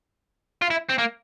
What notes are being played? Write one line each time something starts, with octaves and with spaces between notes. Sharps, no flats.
F4
E4
C4
A#3